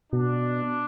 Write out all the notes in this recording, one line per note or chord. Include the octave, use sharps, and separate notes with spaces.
B2 D4